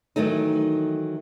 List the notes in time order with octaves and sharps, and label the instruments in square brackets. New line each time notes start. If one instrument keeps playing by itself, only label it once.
[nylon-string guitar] D#3 E3 F#3 A3 D#4